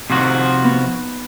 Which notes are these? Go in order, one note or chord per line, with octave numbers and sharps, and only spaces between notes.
C3 F3 D#4 F#4
B3